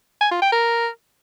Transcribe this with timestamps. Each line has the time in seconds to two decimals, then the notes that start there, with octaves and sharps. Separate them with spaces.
0.21 G#5
0.31 F4
0.42 G5
0.52 A#4